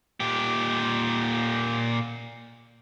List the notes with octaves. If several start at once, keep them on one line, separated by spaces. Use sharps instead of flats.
A#2 G4